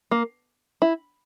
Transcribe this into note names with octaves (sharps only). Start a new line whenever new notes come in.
A#3
E4